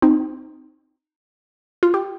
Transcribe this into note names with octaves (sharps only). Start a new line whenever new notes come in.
C4 D#4
F4
G4